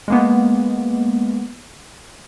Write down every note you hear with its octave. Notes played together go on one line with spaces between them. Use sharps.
G#3 A#3 B3